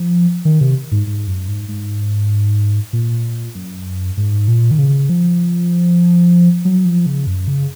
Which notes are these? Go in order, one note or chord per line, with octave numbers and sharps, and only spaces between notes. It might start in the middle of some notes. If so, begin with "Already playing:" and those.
Already playing: F3
D#3
C3
G#2
G#2
F#2
G#2
G#2
A#2
F#2
G#2
A#2
D#3
C#3
F3
F#3
F3
C#3
F#2
C#3